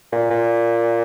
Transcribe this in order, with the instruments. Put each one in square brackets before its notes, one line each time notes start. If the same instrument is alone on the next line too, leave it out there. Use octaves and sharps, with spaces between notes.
[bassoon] A#2
A#2